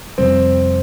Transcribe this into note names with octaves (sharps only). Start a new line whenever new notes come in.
F2 C3 G3 C4